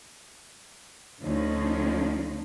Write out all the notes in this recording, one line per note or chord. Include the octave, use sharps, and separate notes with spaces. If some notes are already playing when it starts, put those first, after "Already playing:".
D2 D3 F3 C#4 D#4